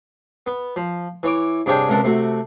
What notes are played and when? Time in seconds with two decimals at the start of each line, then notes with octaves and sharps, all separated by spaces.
0.46 B3
0.76 F3
1.23 E3 C#5 D6
1.66 G2 C3 D4 G#4 C#5 G5
1.89 C#2 C3 A#4 F#5 A5
2.04 C3 A3 F#4